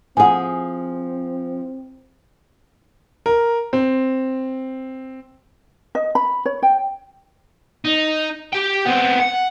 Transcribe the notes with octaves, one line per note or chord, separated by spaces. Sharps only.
F3 C4 G#4 F#5 G#5
A#4
C4
D#5
B5
C#5
G5
D#4
G4 G5
B3 C4
F#5